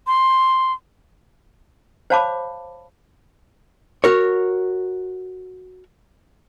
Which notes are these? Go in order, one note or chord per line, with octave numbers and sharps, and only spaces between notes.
C6
C5 C#5 F5 A5 B5 D6
F#4 A#4 C#5